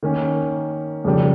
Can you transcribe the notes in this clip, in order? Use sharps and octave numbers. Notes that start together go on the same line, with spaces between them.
D#3 A#3 C#4
F2 C#3 G3 A#3